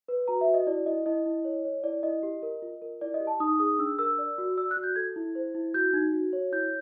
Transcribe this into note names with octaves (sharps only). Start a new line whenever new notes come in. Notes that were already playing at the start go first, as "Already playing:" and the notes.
B4
F#4 A#5
E5
F#4
D#5
E4 D5
E4 D#5
E4 D#5
E4
C#5
C#5
E4 D5
E4 D#5
G4
A#4
F4
A#4
E4 D5
D#5
G4
A5
D#4 D#6
G#4 D#6
D4 E6
A#4 E6
D5
F#4
D5 E6
F#6
F#4
G6
A4 G#6
E4
C5
E4
F#4 G6
D#4 G#6
F#4
C#5
E4 G6